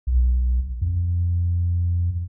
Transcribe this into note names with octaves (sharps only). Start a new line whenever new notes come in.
B1
F2